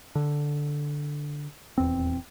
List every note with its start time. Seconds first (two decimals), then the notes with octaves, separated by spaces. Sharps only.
0.15 D3
1.78 D#1 E2 C4